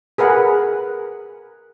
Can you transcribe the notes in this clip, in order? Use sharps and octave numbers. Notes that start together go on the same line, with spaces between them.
G#4 A#4 B4 F#5